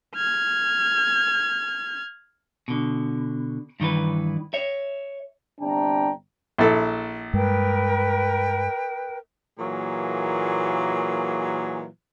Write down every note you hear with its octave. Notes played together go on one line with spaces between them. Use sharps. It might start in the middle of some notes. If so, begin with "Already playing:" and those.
F6 G#6
B2 D3
G2 D#3 E3 B4
C#5 E5
G1 C3 D4 G5 A#5
A#1 E4 A4
G2 G#3 A#4 B4 G5
A#2 E3 F#3 A#3 G#4